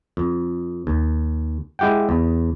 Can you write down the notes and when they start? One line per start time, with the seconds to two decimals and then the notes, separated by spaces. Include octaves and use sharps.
0.17 F2
0.87 D#2
1.79 G#3 E4 G4 F#5 G5
2.09 E2